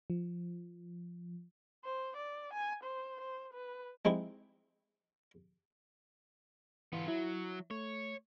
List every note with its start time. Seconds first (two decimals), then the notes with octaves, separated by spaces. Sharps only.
0.10 F3
1.85 C5
2.17 D5
2.54 G#5
2.84 C5
3.21 C5
3.54 B4
4.05 G#3 C4 D#4 E4
6.93 E3 B3 F4
7.08 F#3 E4
7.71 A3 C#5